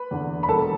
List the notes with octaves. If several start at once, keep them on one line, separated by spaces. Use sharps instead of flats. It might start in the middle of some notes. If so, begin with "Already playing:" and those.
Already playing: B4 B5
E2 D3
B5
E1 A4 A5